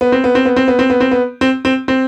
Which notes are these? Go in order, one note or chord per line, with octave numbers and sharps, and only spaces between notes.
B3
C4
B3
C4
B3
C4
B3
C4
B3
C4
B3
C4
C4
C4